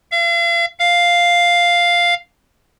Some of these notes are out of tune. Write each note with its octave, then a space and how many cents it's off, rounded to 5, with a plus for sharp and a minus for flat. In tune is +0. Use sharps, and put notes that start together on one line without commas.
F5 -40
F5 +0